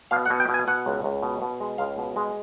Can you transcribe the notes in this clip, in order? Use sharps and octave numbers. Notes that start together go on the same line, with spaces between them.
B2 F5
F#5
B2
G5
B2
G#5
B2 F#5
C#2
C#2
B2
B2
G#3
C#2 F5
B2
G#3